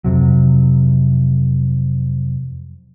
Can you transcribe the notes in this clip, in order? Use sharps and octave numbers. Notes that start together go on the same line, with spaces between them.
F2 C3 F#3